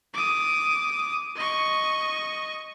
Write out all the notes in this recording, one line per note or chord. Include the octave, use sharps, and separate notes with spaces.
D6 D#6
D#5 C#6